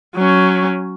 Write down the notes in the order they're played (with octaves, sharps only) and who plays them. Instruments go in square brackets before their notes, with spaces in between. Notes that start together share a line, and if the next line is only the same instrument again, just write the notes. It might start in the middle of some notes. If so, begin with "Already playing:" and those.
[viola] F#3 C#4